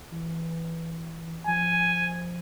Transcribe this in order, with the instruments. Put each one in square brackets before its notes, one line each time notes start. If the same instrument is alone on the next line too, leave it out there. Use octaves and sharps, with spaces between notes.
[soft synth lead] E3
[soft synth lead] F3 [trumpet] G#5